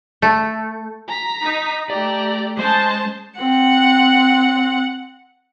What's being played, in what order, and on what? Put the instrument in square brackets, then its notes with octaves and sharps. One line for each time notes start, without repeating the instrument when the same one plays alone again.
[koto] A3
[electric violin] A#5 B6
[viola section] D#4
[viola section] A3 G4 [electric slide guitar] D5 [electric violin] A#5
[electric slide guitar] G#3 [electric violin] C#4 D#5 [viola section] C5 A5
[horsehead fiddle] C4 [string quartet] F#5